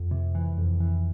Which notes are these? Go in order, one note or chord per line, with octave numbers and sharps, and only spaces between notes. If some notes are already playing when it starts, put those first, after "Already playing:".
Already playing: F2
C3
E3
F2
E3